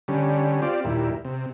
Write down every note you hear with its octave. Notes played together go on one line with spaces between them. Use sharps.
D3 G3 C#4
C4 F4 G4 D5
D#2 A#2 G3 E4
C3